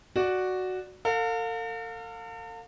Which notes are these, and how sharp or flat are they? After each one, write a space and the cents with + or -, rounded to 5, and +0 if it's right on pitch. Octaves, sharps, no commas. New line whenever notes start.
F#4 +0 D5 +5
A4 +45 F5 +30